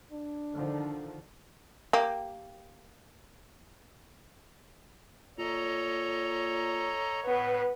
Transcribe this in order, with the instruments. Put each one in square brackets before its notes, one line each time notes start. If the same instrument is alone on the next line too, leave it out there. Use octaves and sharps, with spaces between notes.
[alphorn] D4
[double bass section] D3 D#3 F3
[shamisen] A#3 G4
[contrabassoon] A#2 [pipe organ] A4 D#5 A#5 [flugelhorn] C#5
[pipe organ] A2 [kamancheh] B3 B4